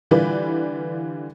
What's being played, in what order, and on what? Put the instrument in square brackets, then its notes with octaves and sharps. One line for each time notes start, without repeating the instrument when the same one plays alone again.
[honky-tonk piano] D3 E3 G3 F4 B4 D5